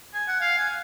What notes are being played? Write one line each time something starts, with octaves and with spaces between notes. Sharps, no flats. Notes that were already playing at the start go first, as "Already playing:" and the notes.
G#5
F#5
F5
G#5